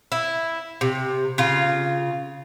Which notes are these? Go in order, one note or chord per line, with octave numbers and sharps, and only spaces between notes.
E4
C3
C#3 F4